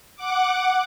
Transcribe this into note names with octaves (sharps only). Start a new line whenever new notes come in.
F#5 D6